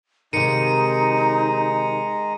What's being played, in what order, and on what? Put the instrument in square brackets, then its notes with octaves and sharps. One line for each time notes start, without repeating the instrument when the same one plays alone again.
[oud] C3 D#3 [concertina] G#3 A#5 [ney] D#4 [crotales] C#7 D#7